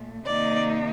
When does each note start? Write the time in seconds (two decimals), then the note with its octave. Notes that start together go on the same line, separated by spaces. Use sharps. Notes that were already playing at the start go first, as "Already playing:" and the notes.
Already playing: A#2 A3
0.27 C3 D#3 A#3 D#4 D5